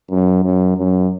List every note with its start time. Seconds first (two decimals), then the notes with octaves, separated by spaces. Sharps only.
0.10 F#2
0.44 F#2
0.77 F#2